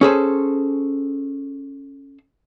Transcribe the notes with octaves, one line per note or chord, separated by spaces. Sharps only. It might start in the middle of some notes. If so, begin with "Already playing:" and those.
C#4 G#4 A4 C5